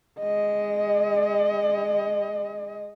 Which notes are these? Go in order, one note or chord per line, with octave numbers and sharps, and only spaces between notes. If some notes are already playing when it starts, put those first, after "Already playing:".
G#3 D#5